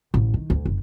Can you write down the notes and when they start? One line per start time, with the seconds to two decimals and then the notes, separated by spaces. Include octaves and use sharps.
0.14 A1
0.34 D#3
0.50 D2
0.66 F#1